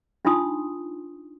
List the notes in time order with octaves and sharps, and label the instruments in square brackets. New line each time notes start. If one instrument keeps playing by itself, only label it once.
[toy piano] D4 D#4 F4 C6 D#6